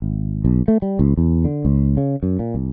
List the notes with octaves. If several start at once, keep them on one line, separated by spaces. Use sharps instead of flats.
G#1
B1
A3
G3
C#2
E2
D3
C#2
C#3
F#2
A#2
C2